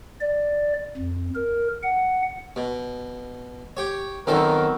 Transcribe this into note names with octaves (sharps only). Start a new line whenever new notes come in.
D5
F2
A#4
F#5
B2
G4 C#5
D#3 F3 F#3 B3 C4 A4 A#4